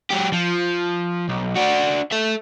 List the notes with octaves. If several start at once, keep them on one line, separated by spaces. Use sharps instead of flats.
F#3 G4
F3
B1
D4 F#4
A4 E5